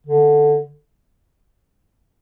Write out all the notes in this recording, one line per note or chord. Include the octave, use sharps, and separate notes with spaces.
D3